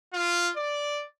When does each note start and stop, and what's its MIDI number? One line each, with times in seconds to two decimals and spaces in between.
0.13 0.51 65
0.56 1.05 74